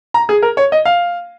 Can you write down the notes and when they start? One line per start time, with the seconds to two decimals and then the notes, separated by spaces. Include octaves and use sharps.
0.14 A#5
0.29 G#4
0.42 A#4
0.57 C#5
0.72 D#5
0.85 F5